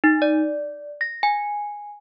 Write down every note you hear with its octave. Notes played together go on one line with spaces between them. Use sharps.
D#4
D5
A#6
G#5